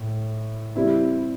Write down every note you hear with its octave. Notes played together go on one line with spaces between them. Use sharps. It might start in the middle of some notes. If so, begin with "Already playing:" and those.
Already playing: A2
G3 C4 E4